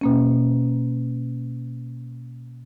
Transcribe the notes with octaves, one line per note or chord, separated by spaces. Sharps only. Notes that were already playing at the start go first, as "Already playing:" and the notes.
B2 A#3 C#4